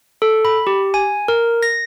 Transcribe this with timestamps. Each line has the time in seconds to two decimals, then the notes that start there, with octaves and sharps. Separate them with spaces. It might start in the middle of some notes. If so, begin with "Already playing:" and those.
0.22 A4
0.45 B5
0.67 G4
0.94 G#5
1.28 A#4
1.63 A#6